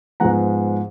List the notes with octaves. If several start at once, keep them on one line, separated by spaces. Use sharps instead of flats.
G#2 F3 G#3 B3 F#5 A#5